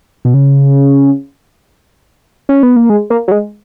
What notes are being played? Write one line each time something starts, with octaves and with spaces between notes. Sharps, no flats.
B2
C#3
C#4
B3
A#3
G#3
A#3
F#3
G#3